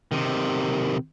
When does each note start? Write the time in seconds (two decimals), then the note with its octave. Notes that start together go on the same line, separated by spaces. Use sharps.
0.12 C3 D#3